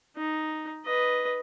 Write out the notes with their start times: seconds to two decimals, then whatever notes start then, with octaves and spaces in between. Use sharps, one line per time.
0.16 D#4
0.85 B4 D#5